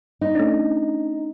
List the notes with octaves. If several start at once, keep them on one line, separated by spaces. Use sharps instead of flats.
D#4
A3 C#4 D4